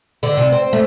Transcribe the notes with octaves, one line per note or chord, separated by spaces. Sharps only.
D3
C3
C4
A3